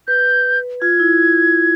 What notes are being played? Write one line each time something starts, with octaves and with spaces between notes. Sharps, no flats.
B4 G6
F4 G#6
E4